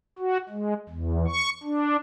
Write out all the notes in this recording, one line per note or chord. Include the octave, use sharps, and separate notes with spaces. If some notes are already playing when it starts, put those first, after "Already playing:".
F#4
G#3
E2
C#6
D4